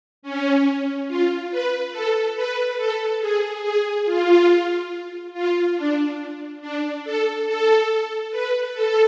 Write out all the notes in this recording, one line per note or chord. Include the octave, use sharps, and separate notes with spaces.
C#4
F4
B4
A4
B4
A4
G#4
G#4
F4
F4
D4
D4
A4
A4
B4
A4